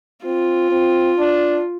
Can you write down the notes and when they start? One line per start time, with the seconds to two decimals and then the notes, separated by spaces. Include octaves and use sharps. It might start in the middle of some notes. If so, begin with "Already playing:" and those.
0.25 C4 F4
0.71 C4
1.18 D4